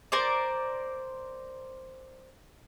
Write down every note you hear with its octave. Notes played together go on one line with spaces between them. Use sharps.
A#4 C5 D5